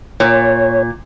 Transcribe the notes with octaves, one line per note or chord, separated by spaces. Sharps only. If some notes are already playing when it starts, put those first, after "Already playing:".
A#2 C#5